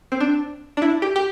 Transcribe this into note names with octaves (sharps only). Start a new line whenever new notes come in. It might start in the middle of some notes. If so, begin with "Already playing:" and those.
C4
D4
D4
E4
G4
G4